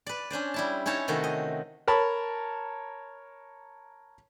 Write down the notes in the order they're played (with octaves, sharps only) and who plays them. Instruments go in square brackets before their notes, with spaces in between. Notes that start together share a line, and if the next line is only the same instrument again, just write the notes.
[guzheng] B4 D5
C#4 D4 C5 D5
G3 E4 A5
C#4 D#4 E4 C#5 A5
C3 D#3 A3 C#4 F#4
D#5
[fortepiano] A#4 C#5 A5 B5